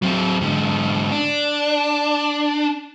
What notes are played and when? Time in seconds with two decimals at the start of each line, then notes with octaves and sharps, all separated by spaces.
0.02 F#3 C4
0.41 G#2 D3
1.12 D4